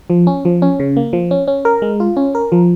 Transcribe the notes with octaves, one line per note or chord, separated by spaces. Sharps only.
F3
C#4
F3
C#4
C#3
A#3
F3
C#4
C#4
A#4
G#3
F4
C#4
A#4
F3